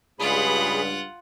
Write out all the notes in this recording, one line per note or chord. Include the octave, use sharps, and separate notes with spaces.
C#2 G2 F4 G#4 F#5 B5